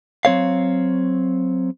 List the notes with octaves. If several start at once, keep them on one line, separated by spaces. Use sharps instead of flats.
F#3 C4 C#5 F5